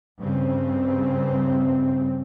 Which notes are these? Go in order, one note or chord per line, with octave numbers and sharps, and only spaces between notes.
G2 C#3 C4